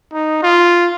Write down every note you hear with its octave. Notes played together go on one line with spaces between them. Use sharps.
D#4
F4